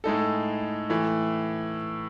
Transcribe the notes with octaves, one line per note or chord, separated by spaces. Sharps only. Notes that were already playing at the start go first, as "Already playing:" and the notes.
A2 G#3 D#4 A4
A2 E3 A3